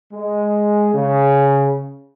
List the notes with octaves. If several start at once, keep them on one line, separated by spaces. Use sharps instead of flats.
G#3
C#3